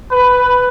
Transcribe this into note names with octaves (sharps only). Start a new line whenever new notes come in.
B4